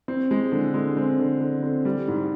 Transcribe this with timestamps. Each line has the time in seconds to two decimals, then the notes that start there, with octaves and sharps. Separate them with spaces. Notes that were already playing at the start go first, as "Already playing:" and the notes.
0.08 C4
0.31 G#3
0.52 D3
0.74 G#3
0.97 C4
1.19 D3
1.40 D3
1.63 C4
1.85 G3
2.08 G#2